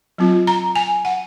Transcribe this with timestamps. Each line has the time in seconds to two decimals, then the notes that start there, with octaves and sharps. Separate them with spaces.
0.18 F#3 C4 F4
0.47 A#5
0.76 G#5
1.05 F#5